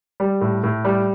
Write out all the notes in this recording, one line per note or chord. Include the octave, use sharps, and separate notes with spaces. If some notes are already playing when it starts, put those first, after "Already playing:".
G3
A2
A2
G3